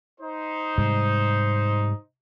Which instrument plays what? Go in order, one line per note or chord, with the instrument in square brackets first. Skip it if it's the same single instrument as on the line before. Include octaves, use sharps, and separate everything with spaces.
[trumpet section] D#4 C5
[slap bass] G#2 C3 G3